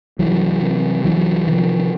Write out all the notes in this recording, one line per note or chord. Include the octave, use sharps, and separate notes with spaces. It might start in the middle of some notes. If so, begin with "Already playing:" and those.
C2 E3 F#3
C3
C2 E3 F#3
C3 D#3 F3